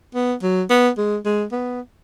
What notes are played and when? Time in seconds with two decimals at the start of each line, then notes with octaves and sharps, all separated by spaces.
0.15 B3
0.43 F#3
0.70 B3
0.98 G#3
1.25 G#3
1.52 B3